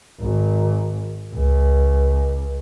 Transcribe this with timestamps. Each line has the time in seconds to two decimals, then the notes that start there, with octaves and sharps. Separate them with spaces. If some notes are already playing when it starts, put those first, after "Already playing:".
0.20 G#1
1.34 C#2